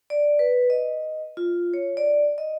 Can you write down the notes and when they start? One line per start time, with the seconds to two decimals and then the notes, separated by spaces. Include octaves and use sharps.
0.10 D5
0.39 B4
0.70 D#5
1.37 F4
1.74 C#5
1.97 D5
2.38 D#5